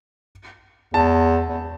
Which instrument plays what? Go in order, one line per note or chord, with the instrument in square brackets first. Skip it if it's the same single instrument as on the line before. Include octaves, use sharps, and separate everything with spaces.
[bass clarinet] E2 [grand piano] A5
[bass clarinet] E2